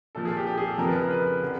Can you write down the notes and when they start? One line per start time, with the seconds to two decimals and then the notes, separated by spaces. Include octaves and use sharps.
0.15 A#2 F3 A4
0.25 G#4
0.37 G4
0.47 G4
0.58 G#4
0.68 A4
0.78 F2 C#3 F3 A#4
0.87 B4
0.96 A#4
1.11 B4
1.44 D3